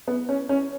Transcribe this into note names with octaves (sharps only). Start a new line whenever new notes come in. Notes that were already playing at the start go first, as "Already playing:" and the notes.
B3
C#4
C#4